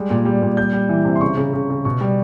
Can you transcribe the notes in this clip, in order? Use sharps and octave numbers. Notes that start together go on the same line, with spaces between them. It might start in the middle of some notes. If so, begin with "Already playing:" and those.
Already playing: G3 G#3
A#2
G3
A#2
G3 G6
G3
E3
C3
C6
C#3 C#6
C#3
C#3
C#3
B2 C#6
G3